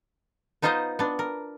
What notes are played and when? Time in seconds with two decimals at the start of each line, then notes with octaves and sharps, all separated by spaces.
0.62 B3 D#4 F4 C5 D#5 A#5
0.99 B3 D4
1.19 A#4